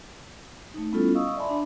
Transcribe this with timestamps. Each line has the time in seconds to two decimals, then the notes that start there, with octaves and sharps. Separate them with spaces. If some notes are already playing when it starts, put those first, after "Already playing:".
0.74 A3 D#4
0.92 G3 B3 C#4 E4 F4 A4
1.14 D#5 F5 C#6 D#6 E6
1.36 D5 E5 G#5 A5 B5 C6
1.49 D4